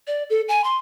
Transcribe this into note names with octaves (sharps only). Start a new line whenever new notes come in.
D5
A4
G#5
C6